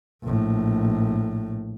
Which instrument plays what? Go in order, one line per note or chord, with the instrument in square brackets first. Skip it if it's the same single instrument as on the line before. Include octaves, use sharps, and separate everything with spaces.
[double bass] A#1 A2